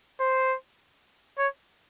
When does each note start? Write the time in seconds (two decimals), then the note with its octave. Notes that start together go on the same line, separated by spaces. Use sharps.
0.20 C5
1.38 C#5